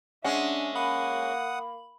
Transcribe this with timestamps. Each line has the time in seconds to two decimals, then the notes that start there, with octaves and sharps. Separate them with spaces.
0.24 G#3 C#4 D4 E5 F#5
0.76 A#3 F#5 B5 D#6